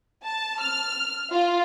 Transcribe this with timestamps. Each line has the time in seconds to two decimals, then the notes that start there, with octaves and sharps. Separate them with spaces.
0.23 A5
0.60 F6
1.32 F4